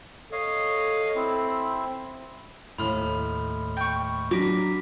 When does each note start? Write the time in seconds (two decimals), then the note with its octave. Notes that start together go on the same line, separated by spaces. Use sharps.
0.32 A4 C#5 D#5 F5
1.15 C4 E4
2.78 D#2 A2 B5 C6 F6
3.77 G5 C#6
4.31 F#3 D4 A#4 D6 B6